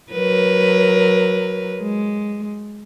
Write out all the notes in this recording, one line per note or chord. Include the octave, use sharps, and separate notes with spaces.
F#3 A#4 B4
G#3